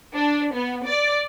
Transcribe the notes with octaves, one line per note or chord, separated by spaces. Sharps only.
D4
B3
D5